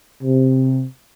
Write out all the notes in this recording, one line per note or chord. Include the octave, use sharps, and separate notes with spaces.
C3